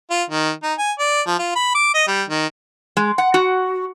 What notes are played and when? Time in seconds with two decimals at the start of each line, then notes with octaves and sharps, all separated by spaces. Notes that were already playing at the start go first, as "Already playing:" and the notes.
0.11 F4
0.30 D#3
0.63 D#4
0.78 G#5
0.99 D5
1.27 F3
1.39 F4
1.56 B5
1.75 D6
1.94 D#5
2.07 G3
2.30 D#3
2.97 G#3
3.18 F#5
3.34 F#4